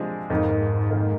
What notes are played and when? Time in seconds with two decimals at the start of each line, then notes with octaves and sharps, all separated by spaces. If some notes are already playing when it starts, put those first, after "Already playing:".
Already playing: C3 F3 G#3 D4 G#4
0.30 F2 G#2 D#3 A#3 D#4
0.90 F2 D#3 A#3 D#4